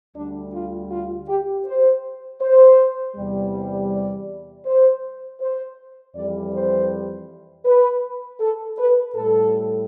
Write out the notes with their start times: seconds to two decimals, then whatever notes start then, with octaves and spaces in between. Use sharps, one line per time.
0.16 D2 D3 G3 D4
0.54 F4
0.91 F4
1.28 G4
1.66 C5
2.41 C5
3.16 E2 C3 G3
3.90 D5
4.66 C5
5.40 C5
6.15 F2 E3 G3 D5
6.54 C5
7.65 B4
8.40 A4
8.78 B4
9.15 A2 G3 A4